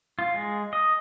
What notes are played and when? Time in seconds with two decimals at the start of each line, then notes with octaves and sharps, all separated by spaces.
0.19 F4
0.34 G#3
0.73 D#5